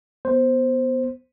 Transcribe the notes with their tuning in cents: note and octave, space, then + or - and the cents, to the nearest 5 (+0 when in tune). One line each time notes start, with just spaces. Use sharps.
B3 +0 C5 +0